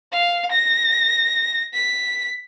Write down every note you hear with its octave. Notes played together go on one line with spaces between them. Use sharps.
F5
A#6
B6